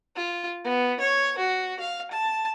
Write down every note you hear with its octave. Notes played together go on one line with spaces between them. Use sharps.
F4
B3
C#5
F#4
F5
A5